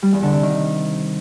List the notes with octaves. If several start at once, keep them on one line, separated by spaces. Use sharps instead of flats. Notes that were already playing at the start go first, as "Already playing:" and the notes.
G3
E2
D3
C3
D#3